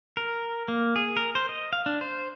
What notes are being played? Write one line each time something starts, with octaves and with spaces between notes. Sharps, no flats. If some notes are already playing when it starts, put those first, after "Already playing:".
A#4
A#3
G#4
A#4
C5
D#5
F5
D4
C5